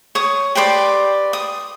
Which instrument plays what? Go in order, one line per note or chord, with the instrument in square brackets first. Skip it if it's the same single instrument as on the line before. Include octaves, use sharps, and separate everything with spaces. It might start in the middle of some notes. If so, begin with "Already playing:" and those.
[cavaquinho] C#5 C#6 D#6
G4 B4 C5 D5
D#6